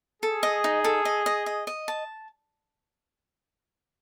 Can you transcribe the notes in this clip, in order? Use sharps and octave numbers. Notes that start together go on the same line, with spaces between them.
G#4 A4
D#5
D#4
A4
D#5
D#5
D#5
D#5
A5